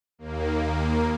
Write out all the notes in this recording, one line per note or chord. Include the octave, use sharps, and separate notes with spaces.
D#2 A#3